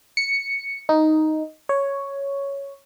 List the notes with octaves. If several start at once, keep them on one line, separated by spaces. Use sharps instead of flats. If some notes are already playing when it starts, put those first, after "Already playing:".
C#7
D#4
C#5